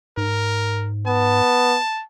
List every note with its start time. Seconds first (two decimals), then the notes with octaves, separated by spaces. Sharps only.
0.17 G#2 A#4
1.07 B3 A5